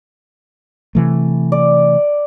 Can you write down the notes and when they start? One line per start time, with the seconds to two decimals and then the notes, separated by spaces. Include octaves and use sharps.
0.95 C3 E3 A3
1.52 D5